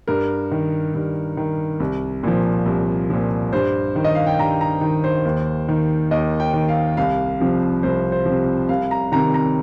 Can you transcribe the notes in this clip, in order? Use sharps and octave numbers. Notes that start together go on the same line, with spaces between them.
G2 A#4
D#3
G2
D#3
C2
A#2 F3
C2
A#2 F3
G2 C5
D#3
D#5
F5
G5
G2 A#5
A#5
D#3
C5
D#2
D#3
D#2 D#5
G5
D#3
F5
C2 F5
C3 F3
C2 C5
C5
C3 F3
C2 F5
A#5
C3 D#3 A#5
A#5